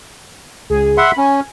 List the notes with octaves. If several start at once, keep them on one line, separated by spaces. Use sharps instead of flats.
C#2 G#4
E5 F#5 B5 C6
C#4 G#5